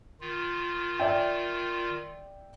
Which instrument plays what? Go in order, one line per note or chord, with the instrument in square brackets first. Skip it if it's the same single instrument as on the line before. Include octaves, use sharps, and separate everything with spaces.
[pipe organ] D#3 F4
[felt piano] D5 E5 G5